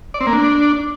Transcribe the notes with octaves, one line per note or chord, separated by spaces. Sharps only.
D5
C4
A#3
D4